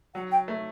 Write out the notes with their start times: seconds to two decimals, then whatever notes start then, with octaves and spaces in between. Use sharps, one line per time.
0.14 F#3 F#5
0.31 G5
0.48 A3